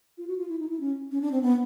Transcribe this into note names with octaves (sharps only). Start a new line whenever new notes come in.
F4
F#4
F4
E4
D#4
E4
C#4
C#4
D4
C4
B3